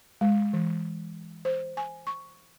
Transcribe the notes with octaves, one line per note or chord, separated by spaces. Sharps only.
G#3
E3
C5
G#5
C#6